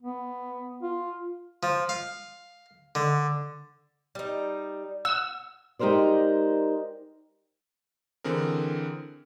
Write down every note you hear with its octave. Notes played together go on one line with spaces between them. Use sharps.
B3
F4
F3
F5
D3
G3 D#4
F#5 E6
G#3 D#4 G4 A#4 C5 D5
D3 E3 C4 G#4 A#4